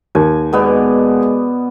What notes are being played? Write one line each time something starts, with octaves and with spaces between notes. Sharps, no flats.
D#2 G#5
B2 G#3 B3 D5